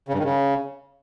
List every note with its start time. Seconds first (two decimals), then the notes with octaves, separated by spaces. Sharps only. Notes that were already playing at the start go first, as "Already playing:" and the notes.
0.08 C#3
0.14 G2
0.19 D#3
0.24 C#3